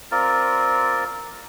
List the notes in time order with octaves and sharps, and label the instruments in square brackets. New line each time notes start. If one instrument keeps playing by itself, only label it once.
[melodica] C4 F4 A#4 D5